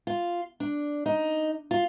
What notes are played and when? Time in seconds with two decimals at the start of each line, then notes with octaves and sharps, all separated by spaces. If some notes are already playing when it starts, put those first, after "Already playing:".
0.07 F4
0.60 D4
1.06 D#4
1.71 F4